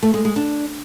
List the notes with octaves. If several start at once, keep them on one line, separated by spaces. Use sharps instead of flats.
A3
G#3
G#3
D4